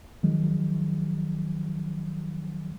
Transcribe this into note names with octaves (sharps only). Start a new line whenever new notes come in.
D#3 F3 F#3 G#3